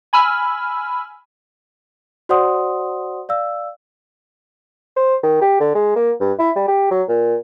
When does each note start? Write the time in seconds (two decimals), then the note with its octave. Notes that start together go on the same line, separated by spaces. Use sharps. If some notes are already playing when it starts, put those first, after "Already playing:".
0.13 G#5 B5 E6 F6
2.29 F#4 C5 D5 F#5 C6 D#6
3.29 D5 F5 E6
4.96 C5
5.23 D#3
5.41 G4
5.60 D3
5.75 G#3
5.96 A#3
6.20 G2
6.39 E4
6.56 G3
6.68 G4
6.91 F#3
7.09 A#2